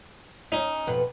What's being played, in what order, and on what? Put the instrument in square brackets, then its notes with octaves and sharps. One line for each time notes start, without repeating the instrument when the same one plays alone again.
[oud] C#4 [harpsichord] D#4
[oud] F2 B2 B4